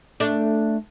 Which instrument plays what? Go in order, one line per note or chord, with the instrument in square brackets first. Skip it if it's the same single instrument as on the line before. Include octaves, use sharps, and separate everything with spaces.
[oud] A3 D4